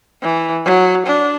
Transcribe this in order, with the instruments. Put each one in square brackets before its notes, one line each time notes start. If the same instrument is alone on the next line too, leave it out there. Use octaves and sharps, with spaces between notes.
[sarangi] E3
F#3
D4